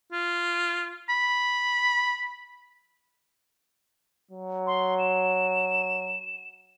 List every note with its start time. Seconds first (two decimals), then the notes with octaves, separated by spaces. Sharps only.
0.12 F4
1.10 B5
4.31 F#3
4.67 C6
4.99 E7